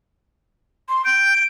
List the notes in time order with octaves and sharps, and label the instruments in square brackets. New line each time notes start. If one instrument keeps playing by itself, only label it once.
[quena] C6
[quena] G6 [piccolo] D7